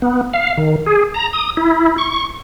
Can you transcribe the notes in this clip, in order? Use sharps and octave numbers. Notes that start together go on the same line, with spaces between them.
B3
F5
D#3
G#4
A#5
D#6
E4
C#6